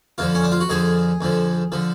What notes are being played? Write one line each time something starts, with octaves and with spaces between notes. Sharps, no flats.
F2 D3 F3 F4
C#4
D4
F4
F#4
F2 D3 F3 G#4
F2 D3 F3
D3 F3